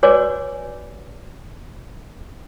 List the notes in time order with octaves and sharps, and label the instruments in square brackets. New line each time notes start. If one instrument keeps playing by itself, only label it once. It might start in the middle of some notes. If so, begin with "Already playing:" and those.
[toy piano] F#4 B4 C#5 D5 G#5 D6